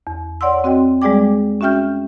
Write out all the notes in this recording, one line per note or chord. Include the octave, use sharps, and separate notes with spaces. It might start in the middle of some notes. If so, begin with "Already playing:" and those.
E2
C#5 D5 F#5 C6 E6
C4 F#4 D#5 G5
G3 G#3 G#4 D5 G5 D6
C#4 F#4 E5 G5 F6 G6